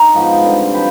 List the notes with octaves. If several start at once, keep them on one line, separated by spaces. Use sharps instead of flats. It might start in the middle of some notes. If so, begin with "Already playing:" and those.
Already playing: D#4
G#2 F3 B3
D3 G3 C4
F3 G4 B4